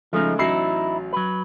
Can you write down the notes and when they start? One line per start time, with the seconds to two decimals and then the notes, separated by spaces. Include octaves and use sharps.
0.13 C#3 F3 G#3 A3 D#4
0.39 A1 F#3 D#4 E4 C7
1.13 F#3 B4